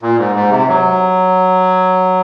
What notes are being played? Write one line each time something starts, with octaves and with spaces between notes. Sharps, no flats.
A#2
G#2
G#2
C3
F#3